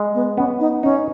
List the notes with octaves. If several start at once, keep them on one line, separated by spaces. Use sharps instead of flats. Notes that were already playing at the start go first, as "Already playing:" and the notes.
Already playing: G#3
B3
B3 C#4
D#4
C#4 D#4